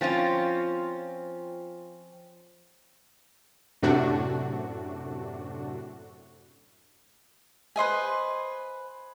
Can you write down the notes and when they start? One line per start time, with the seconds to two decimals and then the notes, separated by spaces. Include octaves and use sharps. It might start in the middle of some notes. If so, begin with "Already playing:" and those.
0.01 F3 C4 C#4 F4
3.83 F#2 A2 C3 A3 D4 F#4
7.76 B4 C5 D#5 G#5